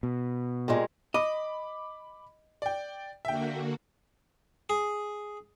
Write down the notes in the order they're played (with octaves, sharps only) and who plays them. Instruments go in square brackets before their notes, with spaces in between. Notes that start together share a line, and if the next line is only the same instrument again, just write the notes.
[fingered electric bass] B2
[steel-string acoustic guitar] A#2 G3 G#3
[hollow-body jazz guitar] D#5 [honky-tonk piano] B5 D6
[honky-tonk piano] D5 G5
[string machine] D3 A#3 F#4 [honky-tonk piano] E5 G5
[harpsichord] G#4